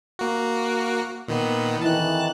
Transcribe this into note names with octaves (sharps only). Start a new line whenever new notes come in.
A#3 F#4
A#2 D#3 B3
F2 D#3 E3 A5 F#6